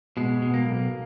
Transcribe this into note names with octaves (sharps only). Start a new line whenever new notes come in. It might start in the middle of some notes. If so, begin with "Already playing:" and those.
B2 G#3
B2
A#3
B1